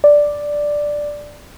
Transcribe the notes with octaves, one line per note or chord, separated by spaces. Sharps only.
D5